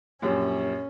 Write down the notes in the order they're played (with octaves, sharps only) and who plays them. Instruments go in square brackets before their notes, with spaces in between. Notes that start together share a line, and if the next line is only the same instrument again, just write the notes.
[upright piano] A#1 F#2 G4 [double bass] C#4